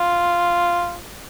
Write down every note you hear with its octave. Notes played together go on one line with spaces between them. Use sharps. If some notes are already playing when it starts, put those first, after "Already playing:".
Already playing: F4